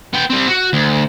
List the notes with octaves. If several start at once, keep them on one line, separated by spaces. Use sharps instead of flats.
B3 G5
G3 C4
F#4
D2